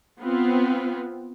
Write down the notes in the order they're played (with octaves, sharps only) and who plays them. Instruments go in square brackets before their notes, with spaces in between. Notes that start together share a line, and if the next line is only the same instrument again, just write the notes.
[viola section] B3 C4 F4